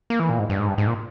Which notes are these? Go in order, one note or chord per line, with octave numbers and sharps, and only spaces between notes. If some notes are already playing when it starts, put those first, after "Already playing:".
A#3
E3
A#2
G#2
G2
G#2
G2
G#2
A#2